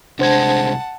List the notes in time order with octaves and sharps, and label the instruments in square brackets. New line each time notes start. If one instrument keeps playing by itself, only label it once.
[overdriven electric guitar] C2 G#3 [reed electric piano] D4 C5 G#6 [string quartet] F#5 A5